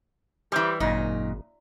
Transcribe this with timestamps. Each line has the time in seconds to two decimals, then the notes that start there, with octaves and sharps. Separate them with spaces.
0.52 E3 G3 G4 C5
0.80 G#1 F#2 A#2 D#4